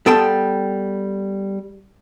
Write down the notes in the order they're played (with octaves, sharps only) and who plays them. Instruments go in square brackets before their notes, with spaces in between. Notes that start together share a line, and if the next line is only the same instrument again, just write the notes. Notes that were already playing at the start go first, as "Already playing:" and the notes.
[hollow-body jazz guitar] G3 B3 A4 G5 A5 C6